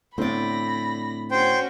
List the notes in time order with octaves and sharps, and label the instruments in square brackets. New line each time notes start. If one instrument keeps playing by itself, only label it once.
[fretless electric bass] A2 D3 [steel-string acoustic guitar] C4 D5 [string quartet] B5 A#6
[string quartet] C#4 F#4 C#5 [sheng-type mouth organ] C5 G5